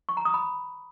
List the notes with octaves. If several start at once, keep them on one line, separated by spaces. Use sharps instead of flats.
C#6
A#5
D#6
B5